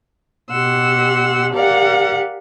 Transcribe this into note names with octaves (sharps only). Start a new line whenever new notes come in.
B2 G4 F#5 C6 E6
G4 A#4 D5 F5 F#5